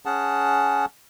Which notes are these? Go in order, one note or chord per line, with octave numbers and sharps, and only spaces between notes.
C#4 G#4 F#5 A5